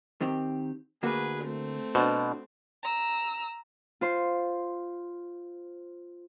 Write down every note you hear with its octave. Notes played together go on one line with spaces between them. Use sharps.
D#3 C4 G4
D2 A#3 F#4 G#4 B4
A3 C4
B2 D4 F#4 C5
A#5 E6
F4 C5 C6